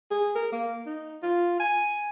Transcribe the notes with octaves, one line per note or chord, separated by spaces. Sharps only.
G#4
A#4
A#3
D#4
F4
G#5